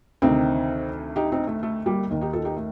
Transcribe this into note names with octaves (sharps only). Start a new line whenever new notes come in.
D2 C3 D#3 C4 D#4
D#4 G4
C4 D#4
A3
A3
G3 A#3
D#2 D#3
D#4 G4
F4 A4
D#4 G4
A3